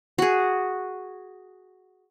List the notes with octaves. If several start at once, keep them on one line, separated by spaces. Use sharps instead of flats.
F#4 G#4